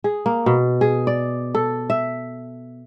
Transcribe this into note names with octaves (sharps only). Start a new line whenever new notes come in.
G#4
A#3
B2
G#4
D5
A4
E5